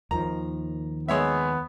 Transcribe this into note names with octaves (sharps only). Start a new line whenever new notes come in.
D#2 D#3 F3 A#5
G#3 B3 C#5 E5